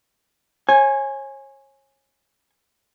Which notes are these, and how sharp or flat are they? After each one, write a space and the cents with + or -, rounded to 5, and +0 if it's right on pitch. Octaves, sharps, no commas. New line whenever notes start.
C#5 -35 G#5 +0